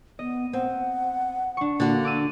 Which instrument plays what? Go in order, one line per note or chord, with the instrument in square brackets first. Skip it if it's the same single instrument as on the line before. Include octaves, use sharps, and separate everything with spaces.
[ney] B3 [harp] D#5
[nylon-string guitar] C4 [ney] F#5
[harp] D4 C#6
[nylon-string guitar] D3 F#4 [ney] A#3
[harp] D6 E6 D#7